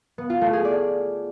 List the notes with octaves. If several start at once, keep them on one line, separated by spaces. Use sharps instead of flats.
B3
F4
A3
G#4
D5